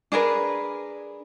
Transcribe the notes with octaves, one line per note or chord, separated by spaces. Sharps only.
D4 G#4 A#4 B4